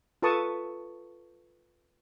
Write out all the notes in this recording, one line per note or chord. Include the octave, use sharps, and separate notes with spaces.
F4 A4 B4 A5 C#6 D#6